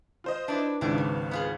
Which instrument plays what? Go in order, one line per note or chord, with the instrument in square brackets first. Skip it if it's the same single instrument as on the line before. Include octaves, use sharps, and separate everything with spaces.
[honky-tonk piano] F4 C5 D#5
[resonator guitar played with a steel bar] D4 E4 [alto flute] B4
[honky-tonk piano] G#1 C#2 D#3 [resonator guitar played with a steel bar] D4 E4 G4 [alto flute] B4
[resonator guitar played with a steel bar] C#3
B3 F4 G#4